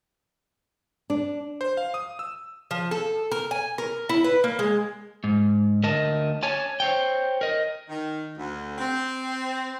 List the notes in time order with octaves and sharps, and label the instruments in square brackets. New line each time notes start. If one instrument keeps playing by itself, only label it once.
[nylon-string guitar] D4
[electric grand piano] C5
F5
D#6
E6
[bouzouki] F3
A4
A#4
G#5
A#4
E4
B4
A#3
G#3
[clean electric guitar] G#2
D2 A#4 D#5 A5
C#5 G#5 A5
C5 C#5 G5
A#4 D#5
[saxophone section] D#3
D2
C4